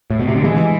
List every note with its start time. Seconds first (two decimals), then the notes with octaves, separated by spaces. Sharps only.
0.10 A2
0.20 B2
0.27 C3
0.35 D3
0.44 E3 G#3